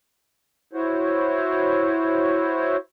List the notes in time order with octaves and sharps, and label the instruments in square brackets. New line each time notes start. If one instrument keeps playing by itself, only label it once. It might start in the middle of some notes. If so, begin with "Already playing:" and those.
[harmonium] E4 F#4 C5 C#5